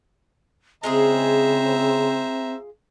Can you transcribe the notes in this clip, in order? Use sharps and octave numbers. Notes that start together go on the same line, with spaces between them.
C#3 G#3 C4 F4 G#4 C5 E5 A#5